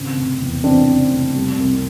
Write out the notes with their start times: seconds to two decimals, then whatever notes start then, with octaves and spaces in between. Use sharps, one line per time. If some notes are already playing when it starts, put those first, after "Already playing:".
Already playing: G#1 C#3 C4
0.16 F1
0.40 E2
0.64 E3 C4 D4
0.88 C#3
1.11 F1
1.35 G3
1.58 C2